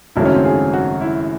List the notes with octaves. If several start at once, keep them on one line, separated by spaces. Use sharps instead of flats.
G#1 F#2 C#3 F#3 A3 E4
C#4
C4
G#4
F#4
E4